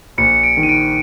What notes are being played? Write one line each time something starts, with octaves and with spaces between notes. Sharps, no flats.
A#1 C#7
D7
D#3
D#7
D7